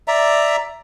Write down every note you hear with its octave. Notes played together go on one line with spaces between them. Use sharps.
D5 E5 A#5